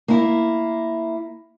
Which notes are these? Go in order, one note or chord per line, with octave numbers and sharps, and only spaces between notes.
A#3 E4